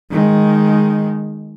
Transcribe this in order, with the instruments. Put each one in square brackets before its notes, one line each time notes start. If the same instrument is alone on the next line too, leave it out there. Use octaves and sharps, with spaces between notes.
[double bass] D#3 G#3